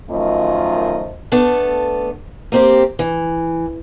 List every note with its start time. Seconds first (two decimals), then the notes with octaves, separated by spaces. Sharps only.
0.11 F#2 D#3 F3 A3 F4 D#5
1.32 A3 B3 D4 A4
2.52 A#3 C4 G4
2.99 E3